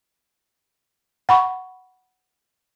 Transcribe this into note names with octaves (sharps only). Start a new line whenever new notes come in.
F#5 B5 C#6